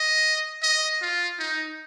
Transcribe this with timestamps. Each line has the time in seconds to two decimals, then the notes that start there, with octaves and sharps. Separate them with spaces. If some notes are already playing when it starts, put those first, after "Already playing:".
Already playing: D#5
0.63 D#5
1.02 F4
1.39 D#4